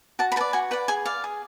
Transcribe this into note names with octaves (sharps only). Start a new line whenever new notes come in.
F#4 A5
B5
B4 D5 A5
F#4 G#5
B4 D5 F#5
G#4 G#5
D5 F5
G#4